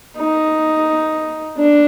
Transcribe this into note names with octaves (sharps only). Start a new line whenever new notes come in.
D#4
D4